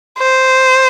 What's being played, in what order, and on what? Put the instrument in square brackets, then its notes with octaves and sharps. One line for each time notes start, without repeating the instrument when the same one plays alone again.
[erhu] C5